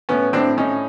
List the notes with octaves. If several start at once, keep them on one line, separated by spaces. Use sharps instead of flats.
A2 B3 C#4
A2 C4 D4
A2 C#4 D#4